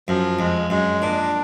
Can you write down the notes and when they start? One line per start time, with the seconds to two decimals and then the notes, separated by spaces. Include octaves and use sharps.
0.08 F#2 F3
0.39 F2 G#3
0.70 F#2 G#3
1.02 A#2 D4